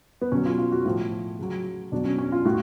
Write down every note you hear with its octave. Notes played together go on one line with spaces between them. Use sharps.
B3
B2 F#3 C#4
F4
F4
F#4
A2 F3 F4
C#3 F#3
B2 F#3 D4
C#4
C#4
F4
A2 F#4